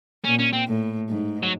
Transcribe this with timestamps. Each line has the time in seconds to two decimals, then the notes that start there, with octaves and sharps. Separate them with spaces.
0.25 A#2 C#4
0.39 C#4
0.53 C4
0.67 A2
1.09 G#2
1.43 F#3